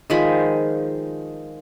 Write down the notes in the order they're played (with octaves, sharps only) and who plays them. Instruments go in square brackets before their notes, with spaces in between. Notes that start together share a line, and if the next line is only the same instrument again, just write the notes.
[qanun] D#3 F3 G#3 B5